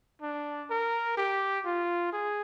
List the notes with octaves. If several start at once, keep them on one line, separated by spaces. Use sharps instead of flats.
D4
A#4
G4
F4
G#4